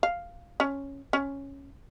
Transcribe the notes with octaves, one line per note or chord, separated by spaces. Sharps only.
F5
C#4
C#4